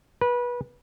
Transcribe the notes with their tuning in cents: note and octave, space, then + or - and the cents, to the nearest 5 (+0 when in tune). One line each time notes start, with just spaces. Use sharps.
B4 -25